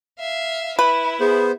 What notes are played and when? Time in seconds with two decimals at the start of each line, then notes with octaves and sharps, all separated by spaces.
0.20 E5 F5
0.79 E4 B4 E5
1.20 B3 G#4 C5